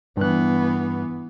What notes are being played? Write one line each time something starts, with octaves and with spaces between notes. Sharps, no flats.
G2 E3 B3 F#6